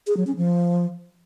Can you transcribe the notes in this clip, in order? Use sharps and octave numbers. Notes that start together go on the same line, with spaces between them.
G#4
F#3
C#4
F3